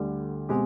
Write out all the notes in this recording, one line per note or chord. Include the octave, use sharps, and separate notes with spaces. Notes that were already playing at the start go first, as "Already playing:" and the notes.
Already playing: D2 D3 G3
B2 G#3 C4 G4